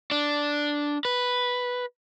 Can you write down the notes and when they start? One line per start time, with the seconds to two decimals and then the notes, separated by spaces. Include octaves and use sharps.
0.11 D4
1.05 B4